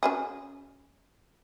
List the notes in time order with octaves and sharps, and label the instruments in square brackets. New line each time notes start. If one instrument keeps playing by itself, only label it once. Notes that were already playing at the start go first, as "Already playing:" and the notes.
[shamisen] C#4 F#4 G#4